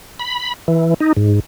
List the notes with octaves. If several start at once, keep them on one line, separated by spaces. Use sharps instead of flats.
B5
E3
D#4
G#2